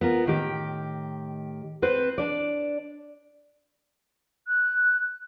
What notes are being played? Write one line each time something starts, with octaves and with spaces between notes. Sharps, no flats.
B3 F4 A#4
A2 D#3 G4
C4 B4 C5
D4 D5
F#6